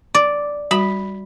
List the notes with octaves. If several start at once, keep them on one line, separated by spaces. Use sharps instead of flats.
D5
G3 F#4 B5